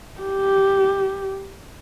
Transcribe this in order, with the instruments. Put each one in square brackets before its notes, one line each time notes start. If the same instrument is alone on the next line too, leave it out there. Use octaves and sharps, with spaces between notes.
[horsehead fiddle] G4